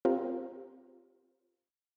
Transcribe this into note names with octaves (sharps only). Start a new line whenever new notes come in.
C4 F4 G4 A#4